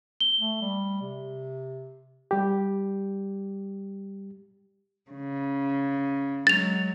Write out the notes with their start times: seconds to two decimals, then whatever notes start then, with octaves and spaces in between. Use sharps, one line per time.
0.20 G7
0.40 A3
0.62 G3
1.01 C3
2.31 G3 G4
5.10 C#3
6.47 F#3 G#3 A6 F7